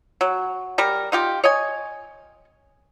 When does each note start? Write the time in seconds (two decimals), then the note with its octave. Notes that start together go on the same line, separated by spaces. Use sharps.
0.21 F#3
0.78 G3 A#4
1.12 D#4 F4 G4
1.44 C#5 D#5 G#5